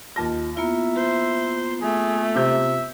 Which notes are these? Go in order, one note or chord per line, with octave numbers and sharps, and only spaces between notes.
D#2 F4 A5 A#6
A#3 B3 E4 F4 E5
C5
A3 G#4
C3 G4 E5 G6